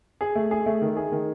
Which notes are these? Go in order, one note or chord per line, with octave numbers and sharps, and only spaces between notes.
G#4
A3
G#4
A3
D#3
G#4
D#3